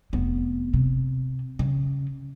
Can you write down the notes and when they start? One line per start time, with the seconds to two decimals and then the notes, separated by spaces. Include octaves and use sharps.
0.13 F1 B3
0.74 C3
1.59 C#3